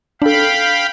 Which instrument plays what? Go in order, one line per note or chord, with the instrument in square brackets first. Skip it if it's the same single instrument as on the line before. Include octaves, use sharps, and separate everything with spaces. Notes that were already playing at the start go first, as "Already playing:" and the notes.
[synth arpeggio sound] D4 A4 [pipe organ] F5 G5 B5